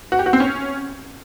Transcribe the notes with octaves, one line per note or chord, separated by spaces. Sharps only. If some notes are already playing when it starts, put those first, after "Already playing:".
F#4
G4
F#4
C4
C#4